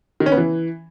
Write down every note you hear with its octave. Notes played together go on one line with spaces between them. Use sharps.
D#3
C#4
B3
E3